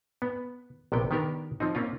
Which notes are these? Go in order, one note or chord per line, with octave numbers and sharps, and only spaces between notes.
B3
A#1 C3 B3 G5
D#3 B3 D4 G4 A#4
F3 C4 D#4
A#3 C4 C#4 F4